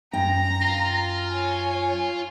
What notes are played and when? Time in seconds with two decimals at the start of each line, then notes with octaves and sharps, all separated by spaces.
0.13 F#2 G5 A#5 A#6
0.62 F4
1.31 C#5 G#5